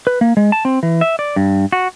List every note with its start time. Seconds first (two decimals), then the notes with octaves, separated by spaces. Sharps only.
0.07 B4
0.21 A#3
0.37 G#3
0.52 A5
0.65 C4
0.83 E3
1.01 E5
1.19 D5
1.36 G2
1.72 F#4